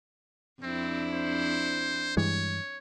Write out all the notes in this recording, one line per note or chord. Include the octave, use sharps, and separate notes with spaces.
F2 C4 D4 E4
C5
G2 E3 G#3 C#5